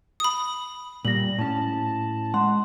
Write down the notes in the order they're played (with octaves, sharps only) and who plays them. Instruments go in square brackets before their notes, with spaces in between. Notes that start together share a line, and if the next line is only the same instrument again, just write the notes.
[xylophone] B5 D#6
[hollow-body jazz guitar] A#2 [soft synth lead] G3 [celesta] A#6 F#7
[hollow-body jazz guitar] A2 C#4 [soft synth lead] A5
[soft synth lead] G#3 [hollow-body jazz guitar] F#5 [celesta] C6